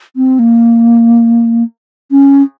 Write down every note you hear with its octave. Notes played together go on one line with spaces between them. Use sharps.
C4
A#3
C#4